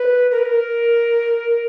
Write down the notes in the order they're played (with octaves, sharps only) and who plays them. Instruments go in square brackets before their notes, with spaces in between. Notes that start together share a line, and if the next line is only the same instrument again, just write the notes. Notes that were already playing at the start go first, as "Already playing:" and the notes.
Already playing: [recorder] B4
A#4
B4
A#4